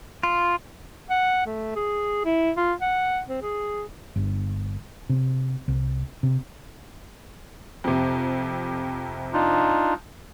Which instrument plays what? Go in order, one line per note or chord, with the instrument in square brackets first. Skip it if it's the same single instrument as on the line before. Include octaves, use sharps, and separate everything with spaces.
[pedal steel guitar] F4
[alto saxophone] F#5
A3
G#4
E4
F4
F#5
C4
G#4
[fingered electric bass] G1
C3
C2
C3
[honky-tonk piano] F2 C3
[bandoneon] D4 D#4 F4